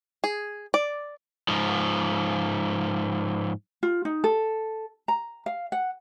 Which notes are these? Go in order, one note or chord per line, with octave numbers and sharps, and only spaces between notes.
G#4
D5
G#2 F3
F4
D#4
A4
A#5
F5
F#5